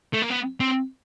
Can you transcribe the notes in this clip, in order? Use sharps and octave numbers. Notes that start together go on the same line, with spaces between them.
A3
A#3
B3
C4